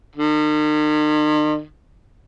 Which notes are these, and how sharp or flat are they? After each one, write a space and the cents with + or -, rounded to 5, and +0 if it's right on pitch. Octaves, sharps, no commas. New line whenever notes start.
D#3 -45